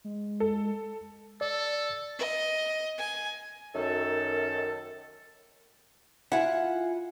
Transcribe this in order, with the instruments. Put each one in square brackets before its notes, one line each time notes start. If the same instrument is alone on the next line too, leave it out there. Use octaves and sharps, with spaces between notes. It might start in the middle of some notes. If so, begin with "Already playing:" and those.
[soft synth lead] G#3
[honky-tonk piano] A4
[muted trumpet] A4 [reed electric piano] D5
[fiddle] D#5
G#5
[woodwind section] F#2 D#3 A4
[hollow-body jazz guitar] E4 [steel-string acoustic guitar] F4 G#5 [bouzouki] F#5